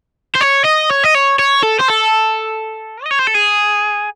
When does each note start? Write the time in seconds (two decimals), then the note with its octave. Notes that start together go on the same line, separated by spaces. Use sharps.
0.35 C5
0.41 C#5
0.64 D#5
0.90 C#5
1.04 D#5
1.15 C#5
1.39 C#5
1.63 A4
1.79 C5
1.88 A4
3.04 D#5
3.11 C#5
3.19 C5
3.27 A4
3.34 G#4